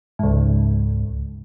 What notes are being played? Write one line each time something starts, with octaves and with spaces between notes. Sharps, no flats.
C#2 G#2